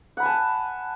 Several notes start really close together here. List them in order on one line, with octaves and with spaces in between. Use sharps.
F#5 B5 G#5 A5